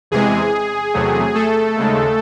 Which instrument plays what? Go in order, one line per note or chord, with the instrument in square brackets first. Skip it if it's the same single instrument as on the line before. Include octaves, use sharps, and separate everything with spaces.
[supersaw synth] E2 C3 E3 G#3 G#4
E2 C3 F#3 A3
A3 A4
D#2 C#3 G#3